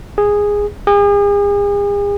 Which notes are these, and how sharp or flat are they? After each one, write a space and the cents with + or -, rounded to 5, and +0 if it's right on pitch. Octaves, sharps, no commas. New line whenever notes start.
G#4 -10
G#4 -40